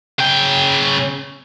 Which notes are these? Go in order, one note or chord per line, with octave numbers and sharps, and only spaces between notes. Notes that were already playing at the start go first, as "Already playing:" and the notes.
C#3 G5